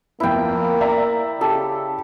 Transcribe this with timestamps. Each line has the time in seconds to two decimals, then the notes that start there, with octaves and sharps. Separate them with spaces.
0.20 F2 A#3 B3 E4 G5
0.81 D5 E5 A#5
1.41 C#3 G4 A4